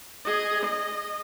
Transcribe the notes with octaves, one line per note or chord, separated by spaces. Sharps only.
G#4 D#5
D#5